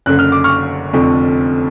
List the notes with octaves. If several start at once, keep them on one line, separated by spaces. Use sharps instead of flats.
F#1 F#2 D3 F#6
F6
D6
C#6 F6
F1 F2 D3